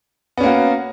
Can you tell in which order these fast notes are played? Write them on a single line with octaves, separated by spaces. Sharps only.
B3 C#4 A#3 F#4